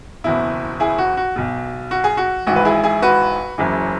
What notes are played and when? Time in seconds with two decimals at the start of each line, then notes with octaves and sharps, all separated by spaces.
0.24 F#1 E2 B2 E4
0.80 E4 G#4
0.98 F#4
1.17 F#4
1.36 B1 B2
1.91 F#4
2.04 G#4
2.17 F#4
2.47 G#1 G#2 E3 F#4
2.56 B4
2.65 E4 G#4
2.84 E4 G#4
3.02 F#4 B4
3.58 F#1 F#2 C#3 E3